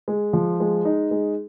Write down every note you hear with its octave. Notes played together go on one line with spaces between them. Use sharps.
G#3
F3
G#3
D#4
G#3